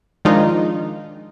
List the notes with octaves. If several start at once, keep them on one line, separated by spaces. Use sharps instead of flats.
D#3 F3 G#3 D4 D#4 F4